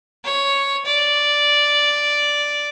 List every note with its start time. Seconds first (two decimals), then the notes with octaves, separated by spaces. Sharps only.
0.24 C#5
0.86 D5